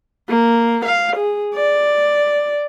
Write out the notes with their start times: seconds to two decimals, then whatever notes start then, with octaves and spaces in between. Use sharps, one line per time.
0.29 A#3
0.85 F5
1.16 G#4
1.55 D5